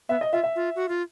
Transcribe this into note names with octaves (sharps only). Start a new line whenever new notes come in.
B3 E5
D#5
F4 E5
E5
F4
F#4
F4